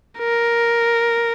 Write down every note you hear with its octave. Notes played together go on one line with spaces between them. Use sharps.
A#4